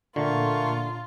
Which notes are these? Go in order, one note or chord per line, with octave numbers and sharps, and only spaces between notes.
A#2 D3 A3 A#3 F4 C#6